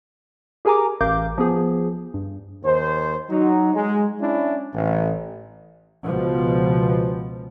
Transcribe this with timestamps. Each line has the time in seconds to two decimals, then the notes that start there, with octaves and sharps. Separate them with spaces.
0.65 G4 G#4 A#4 G#5 A#5 D6
1.01 A1 A#4 F5 D6 G6
1.38 F3 B3 G#4
2.14 G2
2.64 D#2 C5
3.29 F#3 D#4
3.74 G#3
4.20 C#4 D4 E4
4.74 A1
6.04 C#2 B2 F3